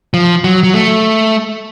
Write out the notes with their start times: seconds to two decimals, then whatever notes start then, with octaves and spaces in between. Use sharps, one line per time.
0.14 F3
0.44 F#3
0.64 F#3
0.73 A3